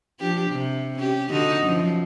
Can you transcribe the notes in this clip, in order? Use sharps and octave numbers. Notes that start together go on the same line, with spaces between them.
F3 D4 G4
C3
C#4 G4
D3 D#4 F#4
F#2 F3